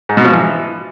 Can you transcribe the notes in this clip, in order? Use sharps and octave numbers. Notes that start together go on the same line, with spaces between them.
G#2
B2
F3
E3